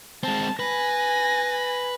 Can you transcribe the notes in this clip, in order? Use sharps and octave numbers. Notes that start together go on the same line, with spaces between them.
G#3 C4 A5
B4 G#5 A#6